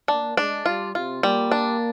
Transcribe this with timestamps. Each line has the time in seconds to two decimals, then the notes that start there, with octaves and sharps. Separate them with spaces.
0.08 A#3 D4
0.37 G#3 D4
0.66 G3 F4
0.94 C3 F4
1.23 G3 A#3
1.52 D4